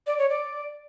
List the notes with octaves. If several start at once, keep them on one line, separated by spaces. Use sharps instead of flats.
D5
C#5
D5